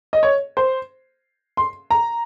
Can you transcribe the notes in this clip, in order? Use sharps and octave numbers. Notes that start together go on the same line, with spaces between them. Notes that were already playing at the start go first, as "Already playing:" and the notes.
D#5
C#5
C5
C6
A#5